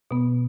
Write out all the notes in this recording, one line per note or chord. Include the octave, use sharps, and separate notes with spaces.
B2 B3